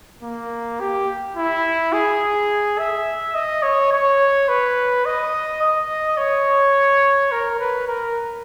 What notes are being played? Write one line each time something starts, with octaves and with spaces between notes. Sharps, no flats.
A#3
G4
E4
G#4
E5
D#5
C#5
C#5
B4
D#5
D#5
C#5
A#4
B4
A#4